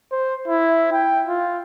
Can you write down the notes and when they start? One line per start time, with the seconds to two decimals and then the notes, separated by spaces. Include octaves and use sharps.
0.12 C5
0.48 E4
0.92 G5
1.27 F4